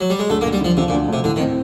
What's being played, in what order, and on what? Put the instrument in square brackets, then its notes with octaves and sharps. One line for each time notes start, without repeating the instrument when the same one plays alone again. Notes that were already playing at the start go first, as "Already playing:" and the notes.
[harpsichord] F#3
G3
G#3
[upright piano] D2 [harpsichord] A3
[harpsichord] A#3
[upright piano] D2
[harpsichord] G3
[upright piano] D3 [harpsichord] F3
[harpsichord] C3 [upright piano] F3
[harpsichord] A#2
[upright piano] D2
[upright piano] D2 [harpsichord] C3
[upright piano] A2 [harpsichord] D3
[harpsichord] D#3
[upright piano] C4